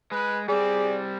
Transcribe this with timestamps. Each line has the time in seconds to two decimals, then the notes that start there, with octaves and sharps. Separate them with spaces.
0.12 G#3 B4
0.49 G3 C4 G#4 D5